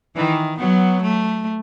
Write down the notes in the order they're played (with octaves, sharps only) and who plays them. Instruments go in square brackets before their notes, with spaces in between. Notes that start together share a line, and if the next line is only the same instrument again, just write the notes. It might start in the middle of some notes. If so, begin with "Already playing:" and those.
[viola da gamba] D#3 [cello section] E3
[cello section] F#3 [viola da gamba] B3
[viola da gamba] A3